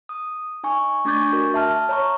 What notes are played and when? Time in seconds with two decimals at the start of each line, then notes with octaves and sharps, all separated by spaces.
0.09 D#6
0.63 D#4 G#5 C#6
1.05 A3 D4 C#6 D6 G6 A6
1.33 F#4 A#4
1.54 E5 A5 F6
1.89 C#5 A#5 C#6